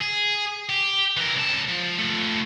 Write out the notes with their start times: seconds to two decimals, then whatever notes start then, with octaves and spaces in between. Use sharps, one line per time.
0.01 G#4
0.69 G4
1.17 E3 A#4
1.36 C#2 A5
1.68 F3
1.98 A3 F4